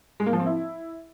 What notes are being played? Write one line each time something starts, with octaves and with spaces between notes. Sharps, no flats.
G#3
A#3
F3
C4
E4